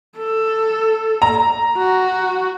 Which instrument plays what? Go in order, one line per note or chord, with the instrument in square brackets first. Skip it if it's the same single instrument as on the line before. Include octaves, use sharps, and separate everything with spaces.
[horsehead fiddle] A4
[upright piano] A#5
[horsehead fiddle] F#4